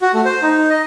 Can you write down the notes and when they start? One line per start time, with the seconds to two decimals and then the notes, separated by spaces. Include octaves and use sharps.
0.02 F#4
0.14 A3
0.25 C5
0.42 D#4
0.70 D#5